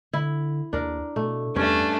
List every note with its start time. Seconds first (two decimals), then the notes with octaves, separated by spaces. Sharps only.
0.13 D3 E4
0.73 D#2 D4 A#4
1.16 B2 A3
1.56 E2 G2 A3 C#4 D4